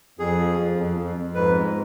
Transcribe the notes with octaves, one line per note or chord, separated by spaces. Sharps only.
F2 G#4
F3
F2
F2
F2
F2
G#2 B4
G#3